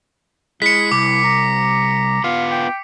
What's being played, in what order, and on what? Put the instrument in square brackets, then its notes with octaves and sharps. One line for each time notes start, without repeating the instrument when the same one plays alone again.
[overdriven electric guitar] G#3 [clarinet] E4 [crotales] B6 C#7
[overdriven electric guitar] C2 [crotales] D6
[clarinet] A#5
[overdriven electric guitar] B3 F4 [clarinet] F5
[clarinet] G5